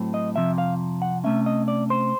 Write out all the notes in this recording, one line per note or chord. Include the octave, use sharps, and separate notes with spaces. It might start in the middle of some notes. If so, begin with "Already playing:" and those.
Already playing: A2 F#3 A3 C4
D#5
F2 C3 F3 E5
F5
F#5
C3 F3 A3 C#4 E5
D#5
D5
C5